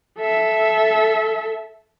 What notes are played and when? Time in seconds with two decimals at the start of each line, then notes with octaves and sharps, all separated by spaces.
0.19 A4 E5